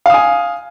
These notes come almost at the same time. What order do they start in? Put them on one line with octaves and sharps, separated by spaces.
F5 D#6 G#5